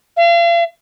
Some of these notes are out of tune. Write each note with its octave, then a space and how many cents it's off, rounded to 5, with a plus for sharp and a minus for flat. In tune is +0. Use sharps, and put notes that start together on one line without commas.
F5 -40